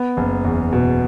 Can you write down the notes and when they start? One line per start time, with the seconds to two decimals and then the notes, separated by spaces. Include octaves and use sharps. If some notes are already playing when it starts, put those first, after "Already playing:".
Already playing: B3
0.17 F#1
0.44 E2
0.72 B2